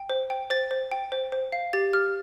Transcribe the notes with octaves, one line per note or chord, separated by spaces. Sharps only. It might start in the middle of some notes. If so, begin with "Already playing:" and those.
Already playing: G5
C5
G5
C5 A6
C5
G5
C5
C5
F5
G4 A6
G4 F6